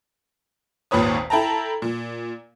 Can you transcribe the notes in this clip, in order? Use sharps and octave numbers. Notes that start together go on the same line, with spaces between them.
G#1 D#2 A#2 B4 C#5 D#6
E4 A4 G5 A5 A#5
A#2